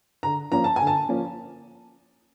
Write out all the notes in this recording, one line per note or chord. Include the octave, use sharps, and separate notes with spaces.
D3 A#5
F3 A#3 C#4 A#5
A5
D3 G#5
A5
F3 A#3 C#4